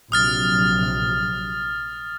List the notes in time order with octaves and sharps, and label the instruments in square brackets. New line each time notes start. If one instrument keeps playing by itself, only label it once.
[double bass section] A#1 C3 F#3 [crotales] D#6 F6 A6